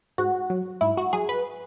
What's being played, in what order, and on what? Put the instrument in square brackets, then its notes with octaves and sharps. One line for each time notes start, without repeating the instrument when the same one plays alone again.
[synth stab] G#2 F#4
F#3
G#2 E4
F#4
F#3 G#4
B4